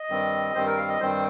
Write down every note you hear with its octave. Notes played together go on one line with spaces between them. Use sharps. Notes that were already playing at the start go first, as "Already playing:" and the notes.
Already playing: D#5
G2 D#3 G3 C4
G2 D#3 G3 C4 C5
A#4
F5
D#5
G2 D#3 G3 C4 C5